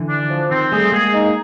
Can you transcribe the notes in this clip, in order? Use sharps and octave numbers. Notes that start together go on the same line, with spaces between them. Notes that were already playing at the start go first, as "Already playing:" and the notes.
Already playing: D3 E3
D4
F3
D#3 C4
G3 A3 G#4
G#3 A#3 G#4
D#4